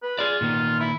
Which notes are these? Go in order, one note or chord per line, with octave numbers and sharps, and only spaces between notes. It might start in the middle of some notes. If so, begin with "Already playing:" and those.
B4
F4 G#4 D5
A#2 D#3 B3
E4